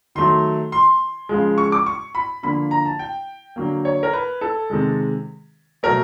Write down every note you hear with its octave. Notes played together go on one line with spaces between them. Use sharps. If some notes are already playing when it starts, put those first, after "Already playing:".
D#3 F#3 A3 C6
C6
C#3 F3 G#3
C#6
D6
C#6
B5
D3 F3 A#3 B5
A#5
A5
G5
D3 F#3 A#3
C#5
A#4
B4
A4
C3 D#3 G#3
B2 F#3 A3 A#4